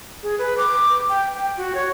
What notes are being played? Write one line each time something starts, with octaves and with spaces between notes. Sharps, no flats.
G#4
B4
D6
G5
G5
F#4
C#5